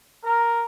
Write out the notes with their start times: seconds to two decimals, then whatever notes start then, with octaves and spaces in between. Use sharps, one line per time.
0.23 A#4